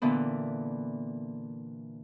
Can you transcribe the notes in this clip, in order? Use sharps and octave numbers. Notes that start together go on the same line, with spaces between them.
A#2 D3 E3 B3